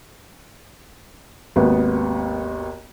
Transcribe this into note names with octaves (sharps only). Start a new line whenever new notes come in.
G#1 D#2 B3 F#4